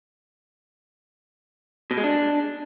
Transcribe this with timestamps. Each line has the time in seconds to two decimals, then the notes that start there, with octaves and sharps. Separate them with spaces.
1.91 B2
1.97 G#3
2.04 D4